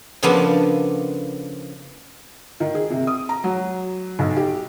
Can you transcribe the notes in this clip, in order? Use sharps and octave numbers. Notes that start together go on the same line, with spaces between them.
C#3 F3 A#3 B3 D4 A4
D#3
G#4
C3
D#6
A#5
F#3
B1
G4